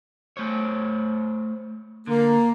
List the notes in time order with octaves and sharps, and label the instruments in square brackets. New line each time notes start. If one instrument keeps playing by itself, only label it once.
[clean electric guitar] A3 C5 C#5
[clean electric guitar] D3 [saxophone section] A#3